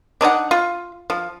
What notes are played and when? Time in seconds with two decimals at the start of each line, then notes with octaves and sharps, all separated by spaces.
0.21 D4 D#4 C#5 F#5
0.51 F4
1.10 F3